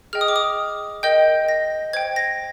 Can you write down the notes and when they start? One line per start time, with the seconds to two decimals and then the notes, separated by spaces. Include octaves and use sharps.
0.13 G#4 D#5 G5 F6
0.21 D#6
0.28 D6
0.36 D#6
1.03 A#4 D#5 G5 G6
1.49 A#6
1.93 C5 G5 G#6
2.16 A#6